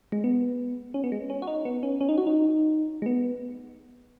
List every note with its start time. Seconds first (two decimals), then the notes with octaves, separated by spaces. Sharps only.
0.12 G#3
0.24 B3
0.94 C#4
1.04 B3
1.12 G#3
1.30 C#4
1.42 F#4
1.48 D#4
1.65 B3
1.83 C#4
2.01 C#4
2.09 D#4
2.18 F#4
2.27 D#4
3.02 G#3
3.06 B3